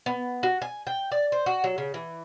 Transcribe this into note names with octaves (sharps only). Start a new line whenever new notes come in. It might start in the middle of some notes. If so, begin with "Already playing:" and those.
B3
F#4
G#5
G5
D5
C5
F#4
F#3
C#3
E3